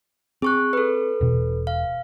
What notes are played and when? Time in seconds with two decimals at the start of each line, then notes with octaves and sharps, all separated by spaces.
0.42 C4 G#4 C#6 F#6
0.73 A4 B4
1.21 E1 B2
1.67 F5